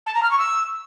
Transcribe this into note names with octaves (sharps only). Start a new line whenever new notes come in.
A5
A#5
F6
C#6
E6